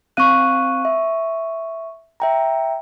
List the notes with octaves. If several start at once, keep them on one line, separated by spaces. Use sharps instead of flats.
C4 F5 C#6 F#6 D#7
E5
E5 G5 A#5